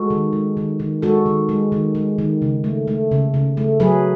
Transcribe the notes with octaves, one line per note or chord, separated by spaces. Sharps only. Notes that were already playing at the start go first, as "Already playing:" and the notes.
Already playing: G#3 F#4 A4
D#3
G#3
D#3
D#3
G#3 F#4 A4
D#3
G#3
D#3
G#3
D#3
C#3
A3
A3
C#3
C#3
A3
F#3 G#4 B4